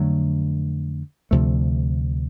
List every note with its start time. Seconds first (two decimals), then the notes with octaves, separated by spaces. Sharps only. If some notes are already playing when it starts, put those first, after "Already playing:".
Already playing: F2 D3 F#3 A3
1.31 D2 C3 F3 A3